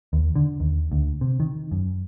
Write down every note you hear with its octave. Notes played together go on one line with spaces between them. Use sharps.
D#2
D3
D#2
D2
C3
D#3
F#2